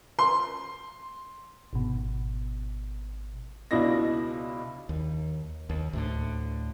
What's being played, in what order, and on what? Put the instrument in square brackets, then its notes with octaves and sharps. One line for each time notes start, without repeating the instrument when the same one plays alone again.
[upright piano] C6
[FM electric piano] G#1 B2
[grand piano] C#2 B2 D4 E4 D#5 A#6
[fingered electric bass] D#2
D#2
D2 A2 D3